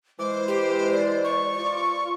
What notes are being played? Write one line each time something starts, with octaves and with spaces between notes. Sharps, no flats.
E3 G#3 C5 D6
G4
D5
C#6
F4 D5